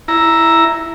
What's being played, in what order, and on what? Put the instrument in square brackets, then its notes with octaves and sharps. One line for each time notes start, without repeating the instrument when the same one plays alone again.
[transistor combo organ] E4 A#5